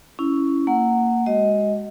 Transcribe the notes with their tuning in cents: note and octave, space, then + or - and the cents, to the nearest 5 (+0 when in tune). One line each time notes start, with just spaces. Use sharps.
C#4 +10 E4 +0
A#3 -15 F#5 +0
G#3 -10 F#4 +40 D#5 +15